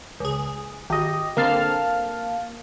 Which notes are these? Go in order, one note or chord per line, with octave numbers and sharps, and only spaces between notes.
C#2 G#4
G#1 G4 D#5
D3 A#3 C4 F5 A5 F6